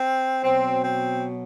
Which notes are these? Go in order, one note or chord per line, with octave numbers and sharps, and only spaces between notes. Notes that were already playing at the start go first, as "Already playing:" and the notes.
Already playing: C4
B2 F#3 C4
C4